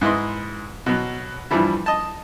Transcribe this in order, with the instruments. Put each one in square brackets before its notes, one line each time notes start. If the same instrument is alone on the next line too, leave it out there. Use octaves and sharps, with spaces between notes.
[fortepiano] G#2 E4 B4 D#5 C6
B2 F#3
G2 E3 F3 G3 E4
D#5 A5